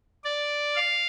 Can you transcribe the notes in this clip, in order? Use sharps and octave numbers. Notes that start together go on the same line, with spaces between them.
D5
F5